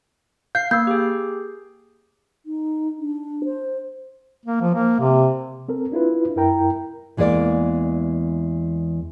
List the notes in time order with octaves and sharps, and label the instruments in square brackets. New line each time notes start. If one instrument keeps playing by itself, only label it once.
[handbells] F5 C7 [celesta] G6
[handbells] A#3 [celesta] E6 G6
[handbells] G4 G#4
[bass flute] D#4
D4
C5
[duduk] A#3
F3
A#3
C3
[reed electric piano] C4 A4 A#4
D4 E4 F4 B4
F#2 E4 A#4 G5 A#5
[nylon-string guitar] E2 E3 G#3 A#3 D5